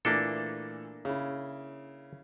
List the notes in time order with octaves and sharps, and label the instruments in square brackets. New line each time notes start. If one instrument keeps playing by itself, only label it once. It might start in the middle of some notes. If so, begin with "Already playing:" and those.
[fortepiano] A#2 E3 A3 [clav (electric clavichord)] A#3 D4 A4
[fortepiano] C#3 E4